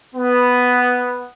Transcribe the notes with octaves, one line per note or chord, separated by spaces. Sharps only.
B3